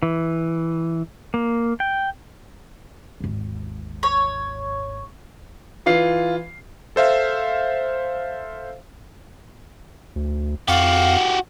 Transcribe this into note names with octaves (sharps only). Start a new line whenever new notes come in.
E3
A#3
G5
G#1 D#2
C#5
E3 F4 C7
A4 C5 E5 F5
D2
F2 F#4 G4 F5